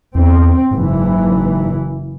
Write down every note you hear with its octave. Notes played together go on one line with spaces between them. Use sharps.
E2 C4
F#1 G#2 E3